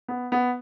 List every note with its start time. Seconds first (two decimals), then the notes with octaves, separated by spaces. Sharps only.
0.08 B3
0.32 B3